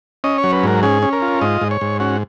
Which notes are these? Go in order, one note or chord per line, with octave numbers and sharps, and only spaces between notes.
C#4 D#5
C#5
F#3
B4
G#2 A#4
C#4 G#4
C#4
A#4
F4
G#2 D#5
G#2
C#5
G#2
C#4 F#4